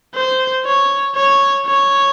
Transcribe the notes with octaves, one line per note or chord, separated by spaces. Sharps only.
C5
C#5
C#5
C#5